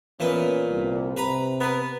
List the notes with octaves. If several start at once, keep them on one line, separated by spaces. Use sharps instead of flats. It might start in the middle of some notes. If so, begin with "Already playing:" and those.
A#2 E3 B3 C#4 B4
C2
C3 B4 A#5 B5
B3 A#4 B4